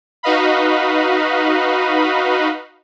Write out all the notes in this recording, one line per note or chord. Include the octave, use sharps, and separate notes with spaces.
D#4 F#4 B4 D#5 F5 B5